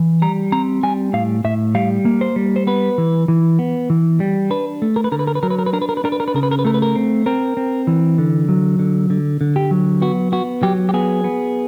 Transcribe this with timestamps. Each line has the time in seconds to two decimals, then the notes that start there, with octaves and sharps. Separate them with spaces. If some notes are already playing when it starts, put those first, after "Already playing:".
Already playing: E3
0.22 G3 A#5
0.52 C4 A#5
0.83 G3 G#5
1.13 A2 F5
1.44 A2 E5
1.75 G3 F5
2.05 A#3
2.21 C5
2.36 G3
2.56 C5
2.67 B3 B4
2.98 E3
3.28 E3
3.59 B3
3.90 E3
4.20 G3
4.50 D4 B4
4.82 A3
4.96 A#4
5.04 B4
5.12 D3 A#4
5.19 B4
5.27 A#4
5.35 B4
5.43 F#3 A#4
5.50 B4
5.59 A#4
5.66 B4
5.73 D4 A#4
5.82 B4
5.89 A#4
5.97 B4
6.04 D4 A#4
6.12 B4
6.20 A#4
6.28 B4
6.34 C#3 A#4
6.43 B4
6.51 A#4
6.59 B4
6.65 A3 A#4
6.74 B4
6.82 A#4
6.96 C4
7.26 C4 A#4
7.57 C4
7.87 E3
8.18 D3
8.49 F#3
8.79 D3
9.10 D3
9.41 D3
9.56 G4
9.71 F#3
10.02 B3 F#4
10.32 B3 F#4
10.63 F#3 G4
10.89 G4
10.94 B3 G#4
11.24 B3